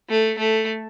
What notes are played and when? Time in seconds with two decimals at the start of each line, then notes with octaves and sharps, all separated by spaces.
0.09 A3
0.38 A3